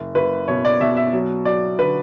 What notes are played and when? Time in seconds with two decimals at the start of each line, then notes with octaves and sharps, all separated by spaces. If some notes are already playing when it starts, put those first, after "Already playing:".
Already playing: F#1
0.15 F#1 B4
0.48 B2 C#5
0.65 D5
0.81 B2 E5
0.97 E5
1.13 F#3
1.45 F#3 D5
1.78 D3 B4